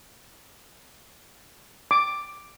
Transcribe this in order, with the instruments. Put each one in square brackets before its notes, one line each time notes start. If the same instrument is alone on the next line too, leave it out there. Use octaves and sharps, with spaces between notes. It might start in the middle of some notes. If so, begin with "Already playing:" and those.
[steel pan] D6